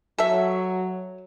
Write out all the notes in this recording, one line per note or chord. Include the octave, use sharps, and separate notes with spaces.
F#3 A4 E5